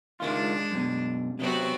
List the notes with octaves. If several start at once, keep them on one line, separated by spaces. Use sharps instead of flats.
C#2 D#3 G#3 D4 F4
F#2 B2
C3 F#3 B3 C4 F#4